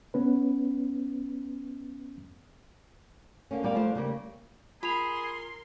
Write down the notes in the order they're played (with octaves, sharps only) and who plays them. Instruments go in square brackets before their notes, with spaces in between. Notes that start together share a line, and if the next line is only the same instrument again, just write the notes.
[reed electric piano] B3 C#4 B4
[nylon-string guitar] D3 A#3 C#4
A#2 G3 A#3 A#4 D5 F5
F3 A3 D4 F4 C5 F5
C#3 G3 A#3
[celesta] F4 F7 [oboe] G#4 [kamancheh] A#4 C6 [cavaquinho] B5